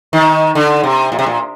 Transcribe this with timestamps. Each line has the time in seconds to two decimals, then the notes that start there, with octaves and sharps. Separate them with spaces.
0.13 D#3
0.55 D3
0.84 C3
1.12 A#2
1.19 C3
1.26 A#2